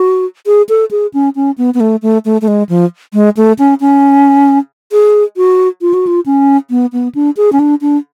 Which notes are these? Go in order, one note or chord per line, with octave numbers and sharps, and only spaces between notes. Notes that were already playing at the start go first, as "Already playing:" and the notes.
Already playing: F#4
G#4
A4
G#4
C#4
C#4
B3
B3
A3
A3
A3
A3
G#3
F3
G#3
A3
C#4
C#4
G#4
F#4
F4
F#4
F4
C#4
B3
B3
D4
G#4
C#4
D4
D4